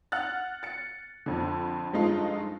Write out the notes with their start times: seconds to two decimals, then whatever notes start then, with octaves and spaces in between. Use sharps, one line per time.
0.12 F#5 F6 F#6 A6
0.63 A6 C#7
1.26 F2 D3
1.93 G2 F3 G#3 A3 D#4 F4